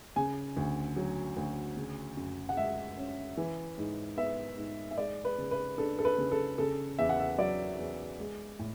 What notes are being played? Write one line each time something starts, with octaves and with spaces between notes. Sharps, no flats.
C#3 G#5
D2
F#3
D2
C#3
F#2
F#5
G#3 E5
C#4
E3
G#2
B3 E5
G#2
E5
G#3 D5
B4
C#3
B4
D4 A4
A4
B4
C#3
A4
C#3 A4
E2 E5
F#5
E5
F#3 D5
E2
G#3
A2